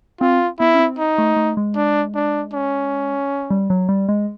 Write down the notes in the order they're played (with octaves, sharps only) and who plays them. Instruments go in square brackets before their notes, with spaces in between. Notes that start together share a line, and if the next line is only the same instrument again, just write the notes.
[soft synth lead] C4 [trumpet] F4
[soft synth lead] B3 [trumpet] E4
[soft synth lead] C#4
C4
[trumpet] D#4
[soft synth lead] A3
A3
G#3
[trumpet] D4
D4
C#4
[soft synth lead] G3
F#3
G3
G#3